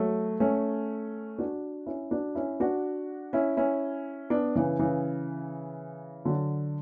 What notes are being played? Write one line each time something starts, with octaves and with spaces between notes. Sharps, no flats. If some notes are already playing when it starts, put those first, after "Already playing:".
Already playing: F#3 A3
A3 C#4
D4 F#4
C#4 E4
D4 F#4
C#4 E4
D4 F#4
C#4 E4
C#4 E4
B3 D4
C#3 E3
C#3 E3
D3 F#3